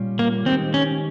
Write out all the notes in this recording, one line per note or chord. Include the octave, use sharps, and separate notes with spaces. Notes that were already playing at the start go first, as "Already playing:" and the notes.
Already playing: A#2 G3 C#4 F4
A#3
D#3 G#3 C4 D#4 G4 A#4
C#4